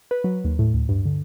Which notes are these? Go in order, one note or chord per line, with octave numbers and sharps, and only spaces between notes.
B4
F#3
D#2
A2
D2
G2
D3